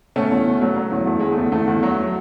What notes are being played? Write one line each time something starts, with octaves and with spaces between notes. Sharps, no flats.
B2 A3 C#4
E2
B2
F#3 A3
F#3
E2
E2 A3
E2 G#3
A3
E2
E2 A3
E2
F#3